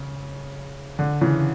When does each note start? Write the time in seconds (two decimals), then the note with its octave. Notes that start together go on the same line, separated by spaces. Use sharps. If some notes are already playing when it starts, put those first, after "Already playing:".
Already playing: C#3
0.99 D3
1.21 C#3 E3